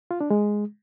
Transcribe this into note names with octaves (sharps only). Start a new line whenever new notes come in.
F4
D4
G#3